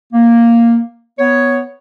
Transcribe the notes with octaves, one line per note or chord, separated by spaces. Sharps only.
A#3
B3 C#5